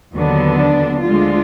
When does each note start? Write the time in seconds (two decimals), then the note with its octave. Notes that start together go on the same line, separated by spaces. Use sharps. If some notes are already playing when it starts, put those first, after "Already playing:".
0.14 D#2 D3 F#3 B3
0.58 D4
1.02 D2 D3 F3 G#3 F4